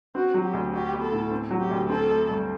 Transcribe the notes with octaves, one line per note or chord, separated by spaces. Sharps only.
C4 F#4
F#3
G4
D2
F#4 G4
B3
A4
A2
C4
F#3
G4
D2
C4 A4
A3
G2